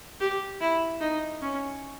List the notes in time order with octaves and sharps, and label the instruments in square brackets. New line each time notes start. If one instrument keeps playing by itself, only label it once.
[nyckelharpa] G4
E4
D#4
C#4